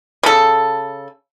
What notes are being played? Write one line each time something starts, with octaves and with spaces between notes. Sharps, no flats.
C#3 A4